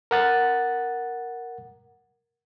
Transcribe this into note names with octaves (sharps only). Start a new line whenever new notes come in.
A#4 F#5 A6